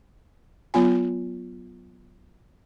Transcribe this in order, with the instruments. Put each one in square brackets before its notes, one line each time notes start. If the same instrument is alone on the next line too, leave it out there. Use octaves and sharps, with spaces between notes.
[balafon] F#3 B3 F4 G#5